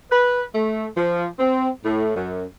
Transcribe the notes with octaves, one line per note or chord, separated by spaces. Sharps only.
B4
A3
F3
C4
A2
F#2